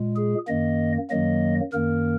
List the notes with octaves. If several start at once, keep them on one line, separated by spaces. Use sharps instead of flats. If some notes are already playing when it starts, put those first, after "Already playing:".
Already playing: A#2 G#3
G#4
F#2 D#3 A#3 D#5
F#2 D#3 F#3 A#3 D#5
F#2 D#3 A#3 A#4